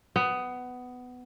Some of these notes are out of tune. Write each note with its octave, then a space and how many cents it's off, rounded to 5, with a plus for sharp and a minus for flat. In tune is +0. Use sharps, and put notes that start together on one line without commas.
B3 +15